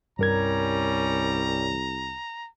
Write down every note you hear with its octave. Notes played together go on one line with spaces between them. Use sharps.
C2 G2 G3 C#4 A#4 A#5 G#6